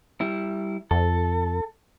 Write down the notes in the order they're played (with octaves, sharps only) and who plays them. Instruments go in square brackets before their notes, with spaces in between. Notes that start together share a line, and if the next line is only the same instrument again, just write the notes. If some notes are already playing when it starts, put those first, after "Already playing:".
[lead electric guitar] G3 E4
[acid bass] F2 [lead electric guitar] A4